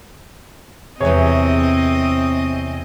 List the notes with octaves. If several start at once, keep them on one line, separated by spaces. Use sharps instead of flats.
E2 G2 C3 C4 G#4 C#5 D#5